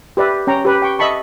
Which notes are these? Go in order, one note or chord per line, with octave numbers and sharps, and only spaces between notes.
G4 B4 D5 E5
C#4 G5 A#5 C#6
G4 B4
G5 C#6
D#5 E5 A5 B5 C#6